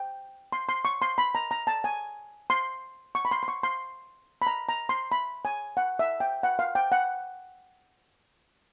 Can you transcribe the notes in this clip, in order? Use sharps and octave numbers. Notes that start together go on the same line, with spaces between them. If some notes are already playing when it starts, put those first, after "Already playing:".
Already playing: G5
C6
C6
C#6
C6
B5
A#5
A#5
A5
G#5
C6
C#6
B5
C6
C6
C#6
C6
B5
A#5
A#5
C6
B5
G#5
F#5
E5
G5
F#5
F5
G5
F#5